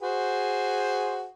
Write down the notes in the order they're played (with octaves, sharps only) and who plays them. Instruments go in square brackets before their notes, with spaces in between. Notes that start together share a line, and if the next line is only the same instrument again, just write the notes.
[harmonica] F#4 G#4 C5